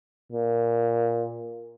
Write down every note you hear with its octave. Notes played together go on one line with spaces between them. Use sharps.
A#2